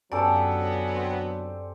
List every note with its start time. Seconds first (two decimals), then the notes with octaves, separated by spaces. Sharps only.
0.12 F#2 D3 F#3 B3 C#4 G4 A4 D5
0.96 C4